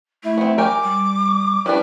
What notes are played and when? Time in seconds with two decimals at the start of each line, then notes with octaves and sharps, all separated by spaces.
0.23 A3 E4
0.38 B3 C4
0.58 A#4 G5 G#5 D6
0.83 G3
1.66 G3 D4 E4 B4